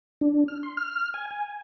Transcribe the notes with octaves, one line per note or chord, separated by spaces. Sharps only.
D4
F6
C6
F6
G#5
G#5